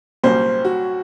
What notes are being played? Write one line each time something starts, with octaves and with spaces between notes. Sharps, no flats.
C2 A#2 F#3 A#3 C#4 C5
F#4